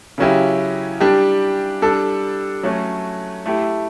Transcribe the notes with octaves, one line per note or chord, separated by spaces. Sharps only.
C#3 F#3 C#4 E4 G4
G3 D4 G4
G3 D4 A4
F#3 A3 C#4
A3 E4 G4